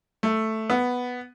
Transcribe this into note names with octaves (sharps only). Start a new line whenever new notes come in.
A3
B3